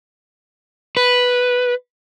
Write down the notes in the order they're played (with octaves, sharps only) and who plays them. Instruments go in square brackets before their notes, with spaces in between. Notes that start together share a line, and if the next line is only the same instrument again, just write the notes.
[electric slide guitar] B4